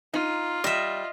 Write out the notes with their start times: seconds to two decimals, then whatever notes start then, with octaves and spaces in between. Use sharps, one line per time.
0.14 D#4 F4
0.64 G3 D#5 E5